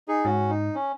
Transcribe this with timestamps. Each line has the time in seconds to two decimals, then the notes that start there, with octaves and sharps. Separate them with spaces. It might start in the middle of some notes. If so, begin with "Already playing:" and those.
0.08 D#4 G#4
0.25 G#2 C#4 F#4
0.49 D#4
0.75 C#4